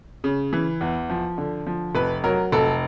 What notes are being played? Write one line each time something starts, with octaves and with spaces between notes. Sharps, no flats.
C#3
E3
E2
F3
D3
F3
F1 B4
F#3 A#4
F1 A4